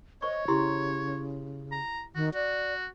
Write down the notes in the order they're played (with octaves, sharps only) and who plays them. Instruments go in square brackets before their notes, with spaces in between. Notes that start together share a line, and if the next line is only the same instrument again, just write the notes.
[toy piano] C5 C#6 [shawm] C#5 [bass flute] D#5
[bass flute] C#3 [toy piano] E4 G4 C6
[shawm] A#5
[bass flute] D#3 [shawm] F#4
[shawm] F#4 [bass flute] D5